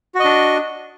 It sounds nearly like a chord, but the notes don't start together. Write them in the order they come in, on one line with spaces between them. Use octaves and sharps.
F#4 D#5 D4